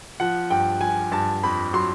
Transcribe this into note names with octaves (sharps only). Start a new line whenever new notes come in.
F3 F#5
G2 G5
F3 G#5
G2 A5
F2 B5
F#3 C6